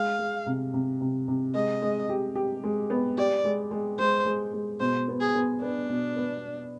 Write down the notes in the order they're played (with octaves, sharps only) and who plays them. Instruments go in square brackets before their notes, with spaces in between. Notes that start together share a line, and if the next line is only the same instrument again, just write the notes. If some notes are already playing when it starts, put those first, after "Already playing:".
Already playing: [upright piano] G#3 [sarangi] F5
[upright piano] G#3
C3
C3
C3
C3
[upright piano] G#3 [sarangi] D#5
[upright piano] G#3
G4
G4
G#3
B3
[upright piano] G4 [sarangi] D5
[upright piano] G#3
G#3
[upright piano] G#3 [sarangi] C5
[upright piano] G#3
G#3
[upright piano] B2 [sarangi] C5
[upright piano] B3
[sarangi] G#4
[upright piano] B3
[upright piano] B3 [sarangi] D4
[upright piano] B2
B3